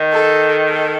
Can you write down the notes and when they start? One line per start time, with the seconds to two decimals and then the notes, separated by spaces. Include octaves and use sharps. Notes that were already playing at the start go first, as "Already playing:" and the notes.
Already playing: D#3
0.12 A4
0.69 A4